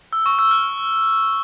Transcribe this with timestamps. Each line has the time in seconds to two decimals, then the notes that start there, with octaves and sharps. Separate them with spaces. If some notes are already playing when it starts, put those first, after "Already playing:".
0.13 E6
0.26 C#6
0.39 E6
0.51 F6